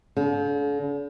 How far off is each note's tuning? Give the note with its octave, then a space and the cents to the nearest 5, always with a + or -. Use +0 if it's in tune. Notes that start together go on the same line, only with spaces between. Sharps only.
D3 -45